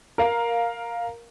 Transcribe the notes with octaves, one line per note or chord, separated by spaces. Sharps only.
A#4 F5